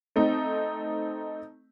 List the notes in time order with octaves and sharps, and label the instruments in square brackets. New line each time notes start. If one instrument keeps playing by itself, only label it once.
[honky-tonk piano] A3 C4 D#4